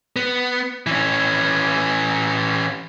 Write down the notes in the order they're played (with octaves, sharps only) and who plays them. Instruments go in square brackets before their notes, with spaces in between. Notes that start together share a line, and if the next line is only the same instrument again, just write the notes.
[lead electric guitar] B3
E3 C#4